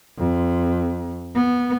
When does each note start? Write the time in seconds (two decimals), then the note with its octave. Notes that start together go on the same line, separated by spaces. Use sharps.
0.18 F2
1.35 B3